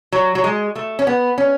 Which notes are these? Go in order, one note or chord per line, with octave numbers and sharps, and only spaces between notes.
F#3
F#3
G#3
A3
C#4
B3
C#4